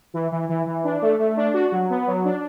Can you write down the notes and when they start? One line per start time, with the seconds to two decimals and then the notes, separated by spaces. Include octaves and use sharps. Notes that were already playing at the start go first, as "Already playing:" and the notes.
0.14 E3
0.32 E3
0.49 E3
0.67 E3
0.84 D4
1.02 A3
1.19 A3
1.37 D4
1.54 F#4
1.72 F#3
1.90 B3
2.07 F#3
2.24 D4